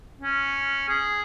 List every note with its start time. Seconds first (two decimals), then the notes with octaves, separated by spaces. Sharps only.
0.21 C#4
0.89 G#4